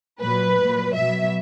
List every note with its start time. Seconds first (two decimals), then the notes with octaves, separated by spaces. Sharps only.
0.20 A#2 F#3 B4
0.57 A#2 F#3
0.95 B2 F#3 E5